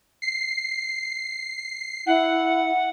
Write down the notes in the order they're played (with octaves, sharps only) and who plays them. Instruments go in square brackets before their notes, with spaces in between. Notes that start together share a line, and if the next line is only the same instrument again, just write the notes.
[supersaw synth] C7
[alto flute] E4 [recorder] F#5